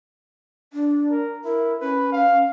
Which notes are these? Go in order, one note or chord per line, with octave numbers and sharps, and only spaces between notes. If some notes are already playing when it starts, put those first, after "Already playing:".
D4
A#4
E4 A#4
C#4 B4
F5